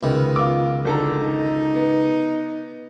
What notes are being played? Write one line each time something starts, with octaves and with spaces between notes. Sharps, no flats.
C#2 D#3 B3
F4 D6
G#1 D3 A4 A#5
D#4
B3